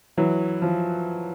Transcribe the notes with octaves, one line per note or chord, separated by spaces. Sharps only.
E3 F#3
F3